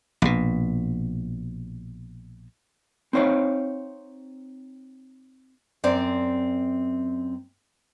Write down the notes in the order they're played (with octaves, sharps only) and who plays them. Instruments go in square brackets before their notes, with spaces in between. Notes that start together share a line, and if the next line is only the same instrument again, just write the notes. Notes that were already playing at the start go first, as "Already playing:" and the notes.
[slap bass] A#1 B2
[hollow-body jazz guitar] C4 D#4 C5 C#5 F5
[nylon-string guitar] F#2 C4 C5 D5